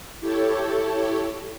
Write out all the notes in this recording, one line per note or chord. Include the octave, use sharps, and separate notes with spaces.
E4 G4 A4 C#5